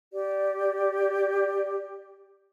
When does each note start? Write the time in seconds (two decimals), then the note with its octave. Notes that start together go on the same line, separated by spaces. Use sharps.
0.13 G4 D5